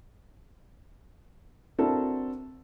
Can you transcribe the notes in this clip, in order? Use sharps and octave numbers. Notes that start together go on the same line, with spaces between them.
C4 D4 E4 F#4 A4 A#4